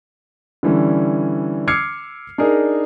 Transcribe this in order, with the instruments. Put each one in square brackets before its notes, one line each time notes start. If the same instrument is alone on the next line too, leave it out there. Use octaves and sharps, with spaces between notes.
[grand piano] D3 E3 G3 C#4
D6 E6 F6 G#6 C7 C#7
D4 D#4 G#4 A#4